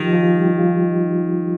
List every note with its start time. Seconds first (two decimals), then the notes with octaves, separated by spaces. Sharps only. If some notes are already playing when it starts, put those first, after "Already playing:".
Already playing: D#3 F3 F4 G4
0.13 F3 F4
0.36 G3 G4
0.48 D#4
0.59 F3 F4